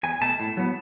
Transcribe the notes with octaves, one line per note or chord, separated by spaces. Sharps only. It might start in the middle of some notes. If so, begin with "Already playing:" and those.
E2 G#5
B2 A3 A5
A2
F#3 B3